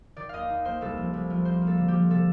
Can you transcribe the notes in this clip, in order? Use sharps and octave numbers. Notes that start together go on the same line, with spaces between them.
D#3 D5
D#2 D#5 F5
D#4
A#3 C5
C2 A4
F3
C2
F3
A#3 C5
A#3
A4
D3
G4
F3
C3 A4